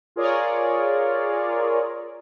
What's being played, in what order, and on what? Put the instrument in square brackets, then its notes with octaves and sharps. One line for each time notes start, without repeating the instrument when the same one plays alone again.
[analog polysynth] F4 G#4 A#4 C#5 D5